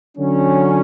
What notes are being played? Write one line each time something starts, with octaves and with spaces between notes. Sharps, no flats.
D3 F#3 C#4